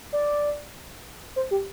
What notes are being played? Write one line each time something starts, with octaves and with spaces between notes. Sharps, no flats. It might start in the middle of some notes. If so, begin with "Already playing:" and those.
D5
C5
G4